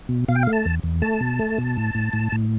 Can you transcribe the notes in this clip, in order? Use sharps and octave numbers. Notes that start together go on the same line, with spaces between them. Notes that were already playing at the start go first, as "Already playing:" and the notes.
B2
B2 F5
G5
F5
A3
A5
E2
E2
A3 A5
B2
A3
B2
A2
A2
A2
A2